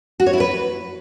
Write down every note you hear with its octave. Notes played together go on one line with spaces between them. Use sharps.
F#4
C#5
E4
B4